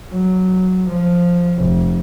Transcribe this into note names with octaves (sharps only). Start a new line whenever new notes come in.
F#3
F3
F1